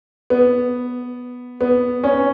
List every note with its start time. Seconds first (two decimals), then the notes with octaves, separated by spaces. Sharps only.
0.30 B3
1.61 B3
2.04 C#4